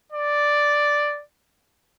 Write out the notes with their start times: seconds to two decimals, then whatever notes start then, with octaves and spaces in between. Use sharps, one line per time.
0.13 D5